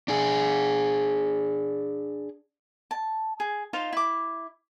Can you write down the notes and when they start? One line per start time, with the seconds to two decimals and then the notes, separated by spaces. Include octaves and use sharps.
0.08 D4 G#4
2.91 A5
3.40 G#4
3.73 D#4 F4 C5 F5
3.93 E4 D6